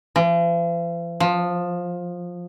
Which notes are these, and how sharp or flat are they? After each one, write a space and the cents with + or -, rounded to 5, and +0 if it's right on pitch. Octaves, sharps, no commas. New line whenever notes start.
F3 -45
F3 +15